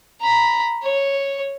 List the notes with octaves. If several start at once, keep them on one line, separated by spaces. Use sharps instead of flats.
A#5 B5
C#5